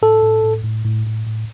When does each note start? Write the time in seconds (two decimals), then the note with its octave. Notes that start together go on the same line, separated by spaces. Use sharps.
0.02 A2 A4
0.23 A2
0.43 A2
0.64 A2
0.85 A2
1.06 A2
1.26 A2